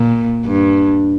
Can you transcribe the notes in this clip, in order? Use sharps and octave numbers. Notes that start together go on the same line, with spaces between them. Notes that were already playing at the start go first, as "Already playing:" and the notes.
Already playing: A#2
G2